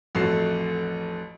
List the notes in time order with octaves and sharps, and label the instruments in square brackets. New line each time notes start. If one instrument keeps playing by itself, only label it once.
[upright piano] A1 F2 A3 F#4 A5 C7